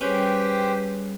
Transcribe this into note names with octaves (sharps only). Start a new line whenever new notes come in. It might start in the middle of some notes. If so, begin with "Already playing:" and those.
G3 C#4 G4 G#4 B4 C5 G5